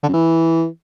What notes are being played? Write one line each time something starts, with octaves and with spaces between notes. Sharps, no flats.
D3
F#2
E3